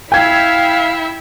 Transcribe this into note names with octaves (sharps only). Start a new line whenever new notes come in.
E4 E5 F5 G5 G#6